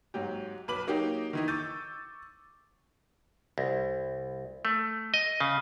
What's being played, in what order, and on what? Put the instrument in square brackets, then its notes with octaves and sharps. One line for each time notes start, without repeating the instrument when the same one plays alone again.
[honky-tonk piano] G#2 F#3 G4
B1 B4 D6 F#7
F#3 A#3 D#4 G4
D#3 E3 D#4
C#6 D6 E6 G6 A6 D#7
[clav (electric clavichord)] C2
A3
D#5
C#3